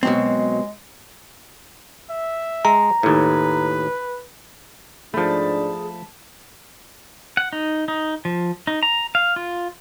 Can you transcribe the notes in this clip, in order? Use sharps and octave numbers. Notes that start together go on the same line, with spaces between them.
B2 F#3 G#3 C4
E5
G#3 A#5
D#2 A2 B4
G#2 F3 A3 D4 G#4 A5 B5
F#5
D#4
D#4
F3
D#4
A#5
F5
F4